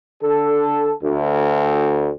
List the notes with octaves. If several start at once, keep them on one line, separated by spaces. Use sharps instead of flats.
D3 A4
D2